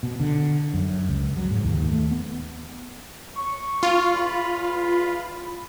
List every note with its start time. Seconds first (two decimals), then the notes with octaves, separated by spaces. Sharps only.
0.03 B2
0.20 D3
0.74 F#2
1.09 C#2
1.37 F#3
1.51 G#2
1.64 D#2
1.89 A3
2.11 B3
3.37 C#6
3.83 F4
4.09 E2 B5